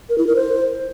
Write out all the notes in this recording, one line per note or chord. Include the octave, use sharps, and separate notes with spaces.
A#4
E4
A#4
C5